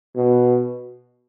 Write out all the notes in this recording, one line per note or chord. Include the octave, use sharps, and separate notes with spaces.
B2